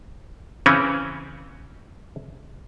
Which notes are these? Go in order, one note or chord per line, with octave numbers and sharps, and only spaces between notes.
C#3 E3 C4 C#4